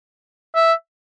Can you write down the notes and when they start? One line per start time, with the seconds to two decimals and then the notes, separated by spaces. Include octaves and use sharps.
0.55 E5